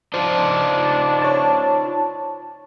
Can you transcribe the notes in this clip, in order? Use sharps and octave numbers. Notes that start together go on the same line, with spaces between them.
D4 D#4 F4 C5
C#5 A5